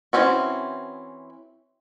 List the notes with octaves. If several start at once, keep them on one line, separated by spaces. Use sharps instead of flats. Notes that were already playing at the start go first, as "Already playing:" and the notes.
E3 F#3 C4 C#4 F#4